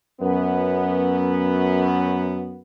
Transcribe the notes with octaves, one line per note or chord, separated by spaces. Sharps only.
F#2 B3